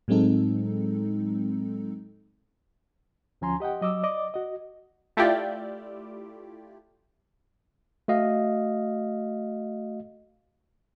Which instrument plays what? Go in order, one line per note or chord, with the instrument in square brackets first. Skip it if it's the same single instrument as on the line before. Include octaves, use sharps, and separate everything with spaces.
[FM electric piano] A2 F#3 G#3 C4 D#4 A4
[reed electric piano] D2 F3 C#4 G#5 A#5 C6
G4 D#5 F#5 G5
F#3 D#5 D6 E6
D5 D#5 D6
F#4 D#5
[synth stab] A3 E4 F4 G4 D5
[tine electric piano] A3 F#4 D#5 F5